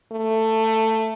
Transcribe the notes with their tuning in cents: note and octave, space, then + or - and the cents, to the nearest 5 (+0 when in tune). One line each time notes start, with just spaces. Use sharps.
A3 +15